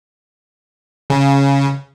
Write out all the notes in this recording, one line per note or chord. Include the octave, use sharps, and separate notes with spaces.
C#3